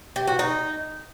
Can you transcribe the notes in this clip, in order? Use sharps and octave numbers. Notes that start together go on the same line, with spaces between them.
G4
F#4
D#4